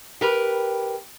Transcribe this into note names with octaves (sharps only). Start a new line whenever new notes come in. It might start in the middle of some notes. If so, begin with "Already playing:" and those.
G4 A#4 B4